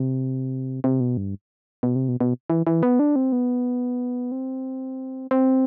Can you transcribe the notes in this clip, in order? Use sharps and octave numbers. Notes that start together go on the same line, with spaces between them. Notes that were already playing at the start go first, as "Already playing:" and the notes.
Already playing: C3
C3
B2
G2
B2
C3
B2
B2
E3
E3
B3
D4
C4
B3
C4
C4